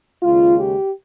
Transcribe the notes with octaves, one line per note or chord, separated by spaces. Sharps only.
D#2 C#3 G#3 F4
G4